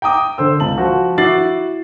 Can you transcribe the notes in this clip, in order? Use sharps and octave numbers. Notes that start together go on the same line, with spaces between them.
G5 A#5 D6 D#6
D3 C5 E6
C#2 A5 F#7
F3 F#4
E4 F#4 D6 A6 C7 F#7